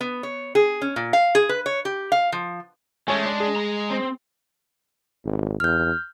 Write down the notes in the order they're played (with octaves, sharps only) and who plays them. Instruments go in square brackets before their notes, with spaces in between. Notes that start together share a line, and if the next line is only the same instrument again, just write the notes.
[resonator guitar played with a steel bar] B3
C#5
G#4
C#4
A#2
F5
G#4
B4
C#5
G4
F5
F3
[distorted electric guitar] G#3 [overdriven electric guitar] A3 C#4 [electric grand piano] C#5 G#5
[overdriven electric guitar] D4
[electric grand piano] G#4
[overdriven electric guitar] A#5
C4
[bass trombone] G#1
[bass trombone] E2 [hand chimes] F6 G6